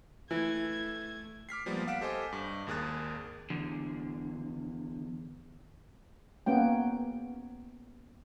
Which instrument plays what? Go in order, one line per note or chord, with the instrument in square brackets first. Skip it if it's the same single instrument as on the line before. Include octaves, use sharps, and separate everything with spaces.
[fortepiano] E3 [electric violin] A3 G#6
[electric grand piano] D6 F6 B6 C7
F3 G3 G#3 A#3 B3
F5 F#5 F6 B6 D7 E7
G4 A4 C5 D#5 G#5 D6
G2
G#1 D#2 G#4 A#4 F#6 A6
[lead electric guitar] E2 D3
[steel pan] A#3 B3 C#4 G5